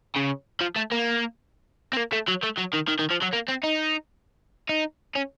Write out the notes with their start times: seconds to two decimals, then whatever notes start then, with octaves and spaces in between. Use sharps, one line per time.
0.16 C#3
0.61 F3
0.76 A3
0.91 A#3
1.93 C4
1.97 A#3
2.12 A3
2.28 F#3
2.43 A3
2.57 F#3
2.73 D#3
2.88 D#3
2.99 D#3
3.11 F3
3.22 F#3
3.33 A#3
3.49 C4
3.64 D#4
4.69 D#4
5.16 C#4